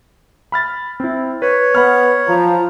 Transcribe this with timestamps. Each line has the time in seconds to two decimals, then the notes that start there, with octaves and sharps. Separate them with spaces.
0.52 B5 F6 A6
1.00 C4 E4
1.42 B4 C#5
1.75 B3 F#5 B5 F6
2.28 F3 A#5